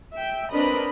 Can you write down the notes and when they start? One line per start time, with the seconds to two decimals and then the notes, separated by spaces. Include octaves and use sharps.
0.15 E5 G5
0.52 C4 D4 A#4 B4 D#5 B5